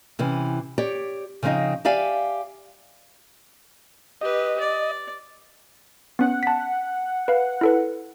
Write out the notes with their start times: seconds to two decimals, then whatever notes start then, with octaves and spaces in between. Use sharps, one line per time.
0.19 C3 E3 C#4
0.78 G4 C#5 D5
1.43 C#3 F3 C4 D#4 D#5
1.85 G4 D5 E5 F5 G#5
4.21 G4 B4 D#5
4.60 D5
6.19 B3 C#4 F#5
6.43 A5 B6
7.28 B4 F5
7.61 E4 A4 B4